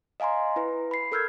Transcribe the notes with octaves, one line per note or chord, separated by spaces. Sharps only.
D#5 F5 G#5 A#5 C6
E4 B4
B5 C7
A4 A#4 E6 F6 G6 G#6